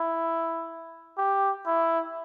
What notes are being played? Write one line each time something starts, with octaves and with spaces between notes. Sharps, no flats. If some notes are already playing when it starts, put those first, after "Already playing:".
Already playing: E4
G4
E4